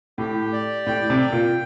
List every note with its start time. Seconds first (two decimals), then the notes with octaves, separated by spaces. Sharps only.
0.18 A2 G4
0.53 D5
0.87 A2 G5
1.10 C3
1.21 G5
1.32 A#2